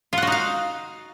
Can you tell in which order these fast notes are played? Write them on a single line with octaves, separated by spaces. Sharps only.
F4 F#5 F#4 D#4 F5